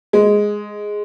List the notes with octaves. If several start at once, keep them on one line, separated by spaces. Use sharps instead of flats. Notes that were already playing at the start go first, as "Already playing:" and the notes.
G#3